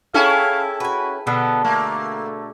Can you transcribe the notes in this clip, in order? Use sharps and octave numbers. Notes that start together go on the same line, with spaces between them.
C#4 E4 G#4 A4 F5 G5 A5
F#4 B4 G#5
B2 D3 B3 A4
A3 A#3